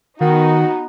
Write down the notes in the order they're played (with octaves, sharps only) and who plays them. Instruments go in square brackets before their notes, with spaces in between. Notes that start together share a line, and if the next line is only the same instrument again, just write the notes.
[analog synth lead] D#3 [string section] B3 D#4 [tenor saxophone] F#4